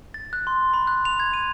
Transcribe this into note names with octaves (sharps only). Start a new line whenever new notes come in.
A6
F#6
C6
B5
F#6
F7
G#6
D#7